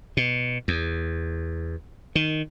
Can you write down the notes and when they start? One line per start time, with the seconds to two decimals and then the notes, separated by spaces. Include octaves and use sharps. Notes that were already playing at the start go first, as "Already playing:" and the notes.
0.17 B2
0.68 E2
2.15 D#3